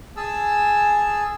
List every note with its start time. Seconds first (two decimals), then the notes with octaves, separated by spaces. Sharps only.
0.17 G#4 G#5 A5 E6